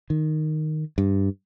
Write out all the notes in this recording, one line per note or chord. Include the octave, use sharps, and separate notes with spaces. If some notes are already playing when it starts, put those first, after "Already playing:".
D#3
G2